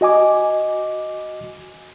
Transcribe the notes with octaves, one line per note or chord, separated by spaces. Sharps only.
F#4 D#5 G#5 D6